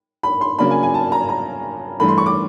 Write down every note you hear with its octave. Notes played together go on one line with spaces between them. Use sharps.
B5
C6
C#3 F#3 A#3 D4 B5
G#5
G#5
A5
A#5
A#5
G2 E3 A3 B5
C6
C#6
D6